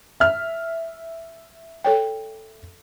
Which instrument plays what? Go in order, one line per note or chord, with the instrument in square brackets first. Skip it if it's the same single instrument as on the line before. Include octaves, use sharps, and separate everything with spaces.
[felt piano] E5 F6
[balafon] A4 C#5 G5